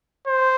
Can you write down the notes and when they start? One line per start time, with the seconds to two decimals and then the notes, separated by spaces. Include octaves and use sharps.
0.27 C5